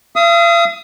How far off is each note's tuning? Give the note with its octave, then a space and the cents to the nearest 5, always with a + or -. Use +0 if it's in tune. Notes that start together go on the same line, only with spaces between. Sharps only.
F5 -45 D#6 +20